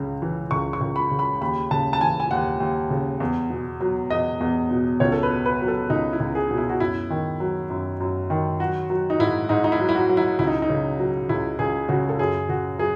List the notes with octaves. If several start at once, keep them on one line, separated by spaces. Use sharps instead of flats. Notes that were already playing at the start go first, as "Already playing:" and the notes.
Already playing: C#2 C#3
E3
C#2 C#6
C#6
C#2
B5
C#3
B5
D#2 B5
C#3 A5
A5
E3 G#5
G#5
D#2 F#5
D#2
C#3
E2
B2
F#3
E2 D#5
E2
B2
C#2 C#5
A4
B4
B2
B4
F#3
A4
C#2 D#4
E4
C#2
G#4
B2
E4
F#4
F#2 E4
D#3
F#3
F#2
F#2
D#3
F#3 F#4
F#3
D#4
G#2 E4
G#2 D#4
D#4
E4
F#3
E4
F#4
F#3
E4
C#2 E4
D#4
D#4
C#3
F#3
C#2 E4
C#2 G#4
C#3 F#4
A4
F#2 G#4
C#3 F#4
F#3 G#4